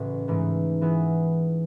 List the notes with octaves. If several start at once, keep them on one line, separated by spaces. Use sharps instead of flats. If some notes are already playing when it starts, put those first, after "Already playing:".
Already playing: A1 A2 C#3 G#3 C#4 F#4
G#2 E3 A3 D#4
E3 B3 E4 G#4